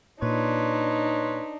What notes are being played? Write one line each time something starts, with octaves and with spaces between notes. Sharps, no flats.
A#2 D4 D#4 B4 C#5 C6